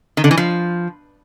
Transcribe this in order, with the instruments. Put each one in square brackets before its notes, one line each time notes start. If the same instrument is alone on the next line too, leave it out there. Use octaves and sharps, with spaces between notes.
[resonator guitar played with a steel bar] D#3
D3
E3
F3